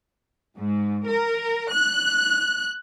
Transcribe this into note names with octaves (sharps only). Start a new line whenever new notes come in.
G#2
A#4
F#6